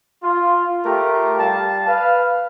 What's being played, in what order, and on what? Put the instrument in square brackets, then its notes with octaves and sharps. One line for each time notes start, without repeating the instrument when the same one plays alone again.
[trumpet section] F4
A3 F4 G4 A#4
G3 F5 A5
B4 F5